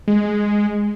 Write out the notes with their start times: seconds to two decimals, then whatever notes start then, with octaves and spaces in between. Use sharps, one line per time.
0.08 G#3